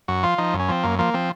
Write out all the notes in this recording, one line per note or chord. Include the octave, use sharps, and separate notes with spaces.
F#2 F#4
F3 F4
F3 D#4
F#2
C#4
F3 C4
F#2 A#3
F3 A#3
F3 C4